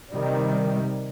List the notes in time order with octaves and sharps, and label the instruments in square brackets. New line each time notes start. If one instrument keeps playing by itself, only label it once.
[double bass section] C3 D#3 G3